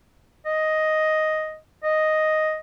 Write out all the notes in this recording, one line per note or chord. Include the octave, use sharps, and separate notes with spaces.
D#5
D#5